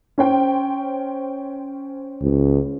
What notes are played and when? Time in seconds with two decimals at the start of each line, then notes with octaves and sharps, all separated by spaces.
0.18 C#4 C5 G5
2.22 C#2